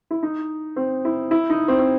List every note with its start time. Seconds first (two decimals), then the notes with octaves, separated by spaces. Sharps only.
0.11 E4
0.23 D#4
0.76 C4
1.05 E4
1.31 E4
1.50 D#4
1.68 C4
1.79 C4